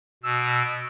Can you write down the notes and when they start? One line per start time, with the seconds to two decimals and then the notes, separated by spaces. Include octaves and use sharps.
0.23 B2 E6